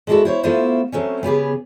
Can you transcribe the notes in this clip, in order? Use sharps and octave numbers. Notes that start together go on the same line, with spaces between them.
G#3 B3 D4 E4 F#4 A4
E4 C5 C#5
A3 B3 E4 F4 C5 F5
F#3 A3 C4 C#4
C#3 B3 G4 G#4